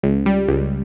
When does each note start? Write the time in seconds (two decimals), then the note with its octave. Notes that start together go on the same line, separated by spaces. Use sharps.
0.03 C#2
0.26 G3
0.48 C#2